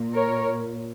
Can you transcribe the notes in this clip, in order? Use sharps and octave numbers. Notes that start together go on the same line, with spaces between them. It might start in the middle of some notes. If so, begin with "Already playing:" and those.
Already playing: A#2
A#4 C#5